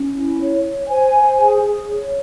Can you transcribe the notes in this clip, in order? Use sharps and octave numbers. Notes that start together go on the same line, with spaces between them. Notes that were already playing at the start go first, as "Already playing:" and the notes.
Already playing: C#4
E4
C#5
C#5
C5 G#5
C5
G#4
G#4
C#5